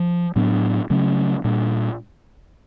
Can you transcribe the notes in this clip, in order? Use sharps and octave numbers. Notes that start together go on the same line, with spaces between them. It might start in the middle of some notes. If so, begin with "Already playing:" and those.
Already playing: F3
A2 F#3 B3 D4
C#3 F#3 A3 C#4
A#2 G3 A#3 D4